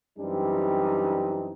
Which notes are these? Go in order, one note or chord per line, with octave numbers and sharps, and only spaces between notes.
F#2 E3 G3 C4 D4 D#4